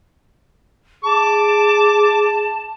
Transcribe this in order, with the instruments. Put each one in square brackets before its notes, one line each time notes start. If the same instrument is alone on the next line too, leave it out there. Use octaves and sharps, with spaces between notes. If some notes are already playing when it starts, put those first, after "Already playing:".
[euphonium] G#4 [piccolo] A5 [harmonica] D6